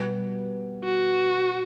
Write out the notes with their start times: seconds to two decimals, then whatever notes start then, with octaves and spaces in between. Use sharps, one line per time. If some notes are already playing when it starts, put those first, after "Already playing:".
Already playing: B2 G3 B3
0.84 F#4